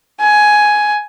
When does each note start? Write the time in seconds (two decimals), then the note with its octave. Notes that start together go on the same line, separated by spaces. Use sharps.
0.21 G#5